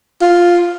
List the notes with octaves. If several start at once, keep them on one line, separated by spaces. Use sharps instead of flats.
F4